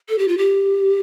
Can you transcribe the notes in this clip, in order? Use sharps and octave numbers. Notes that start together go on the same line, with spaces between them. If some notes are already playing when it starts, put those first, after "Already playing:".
A4
G4
F4
G4